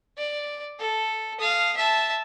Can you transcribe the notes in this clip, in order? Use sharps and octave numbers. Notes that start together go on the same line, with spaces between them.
D5
A4
F5 D#6
E5 A5